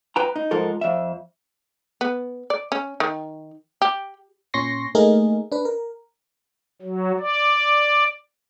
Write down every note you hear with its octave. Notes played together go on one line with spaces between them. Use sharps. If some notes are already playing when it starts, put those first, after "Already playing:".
B4 G5 A#5
D#4
G#2 F3 A4 A#4
F2 E5
B3
D5
C#4
D#3
G4
A#2 C#4 C6 C#6 A#6 C7
A3 A#3 D#4 G#4 A#4
D4 B4
A#4
F#3
D5